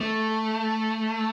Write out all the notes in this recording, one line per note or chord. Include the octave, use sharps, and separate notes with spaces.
A3